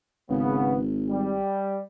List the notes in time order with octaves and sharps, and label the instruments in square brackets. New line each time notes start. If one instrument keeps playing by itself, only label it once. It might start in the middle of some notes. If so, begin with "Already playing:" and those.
[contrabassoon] G#1 [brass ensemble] C#3 B3
[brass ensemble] G3